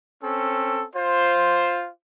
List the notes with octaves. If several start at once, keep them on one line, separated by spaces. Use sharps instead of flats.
C4 C#4 A4
F4 C5